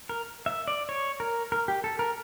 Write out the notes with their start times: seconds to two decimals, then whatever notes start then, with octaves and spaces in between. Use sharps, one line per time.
0.09 A#4
0.46 E5
0.68 D5
0.89 C#5
1.20 A#4
1.52 A#4
1.68 G4
1.84 A4
1.99 A#4